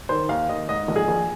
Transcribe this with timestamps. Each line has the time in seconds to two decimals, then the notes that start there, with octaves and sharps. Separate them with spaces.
0.09 D#3 C5
0.29 D#2 F5
0.49 D#2 D#5
0.69 G#2 D#5
0.88 A#1
0.96 G#4
1.08 A#1